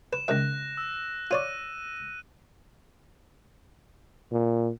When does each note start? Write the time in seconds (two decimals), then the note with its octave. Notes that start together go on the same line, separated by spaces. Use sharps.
0.13 B4 E7
0.28 C#2 D#3 E5 F#6 A#6
0.77 E6
1.31 F4 C#5 D5 D#7
4.32 A#2